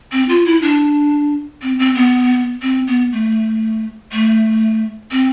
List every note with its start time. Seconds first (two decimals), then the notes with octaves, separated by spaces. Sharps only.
0.12 C4
0.29 F4
0.45 E4
0.62 D4
1.62 C4
1.79 C4
1.95 B3
2.62 C4
2.87 B3
3.12 A3
4.12 A3
5.12 C4